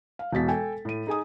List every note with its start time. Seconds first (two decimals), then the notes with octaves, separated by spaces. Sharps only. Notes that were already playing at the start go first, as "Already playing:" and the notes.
0.19 F5
0.33 E1 B2 A6 B6
0.48 A4 G5 G#5
0.85 A2 D#7
1.07 D#4 G#4 G#5 D#6